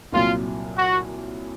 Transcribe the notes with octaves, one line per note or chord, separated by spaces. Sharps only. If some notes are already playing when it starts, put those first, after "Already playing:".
C2 A#2 F#3 F4
F#4